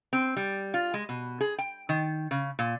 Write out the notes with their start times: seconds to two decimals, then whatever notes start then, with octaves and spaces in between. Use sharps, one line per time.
0.13 C4
0.37 G3
0.74 F4
0.94 G#3
1.09 B2
1.41 G#4
1.58 G5
1.89 D#3
2.31 C#3
2.59 A#2